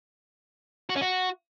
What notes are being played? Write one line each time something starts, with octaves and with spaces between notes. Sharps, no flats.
F#4
C#4
F#4